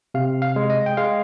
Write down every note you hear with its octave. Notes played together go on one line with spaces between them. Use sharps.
C3 F5
F5
G#3
D#5
G5
G#3 F5